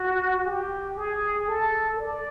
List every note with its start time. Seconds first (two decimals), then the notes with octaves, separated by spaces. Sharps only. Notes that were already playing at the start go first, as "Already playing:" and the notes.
Already playing: F#4
0.45 G4
0.97 G#4
1.48 A4
1.99 D5